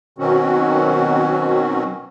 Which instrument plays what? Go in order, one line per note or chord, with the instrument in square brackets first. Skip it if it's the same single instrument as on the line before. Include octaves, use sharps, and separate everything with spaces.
[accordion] B2 D#3 F#3 C4 C#4 F#4